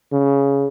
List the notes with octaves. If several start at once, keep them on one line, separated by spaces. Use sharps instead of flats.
C#3